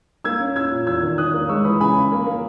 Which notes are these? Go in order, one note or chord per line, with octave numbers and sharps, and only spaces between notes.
A#3 E6 G#6
C#4
C#4 E6 G#6
A#2
E2 E6 G#6
D#3
D#3 D#6 F#6
A#3
G#3 C#6 E6
E3 B5 D#6
C#3 G#5 B5
C#3
A#3
A#3